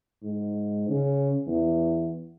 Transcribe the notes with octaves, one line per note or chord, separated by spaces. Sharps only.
G#2
C#3
E2